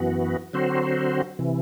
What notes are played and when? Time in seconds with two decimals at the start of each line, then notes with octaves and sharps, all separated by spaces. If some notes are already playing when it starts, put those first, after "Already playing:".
Already playing: F#2 E3 B3 F#4
0.53 D3 F#3 C4 F#4 C5
1.39 C3 E3